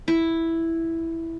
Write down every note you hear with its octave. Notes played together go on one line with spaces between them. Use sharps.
E4